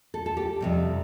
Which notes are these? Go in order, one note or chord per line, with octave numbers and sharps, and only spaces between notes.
A4
A4
G4
F2 C3 G3